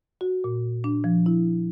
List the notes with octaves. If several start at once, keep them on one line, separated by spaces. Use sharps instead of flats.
F#4
A#2
D4
F3
E4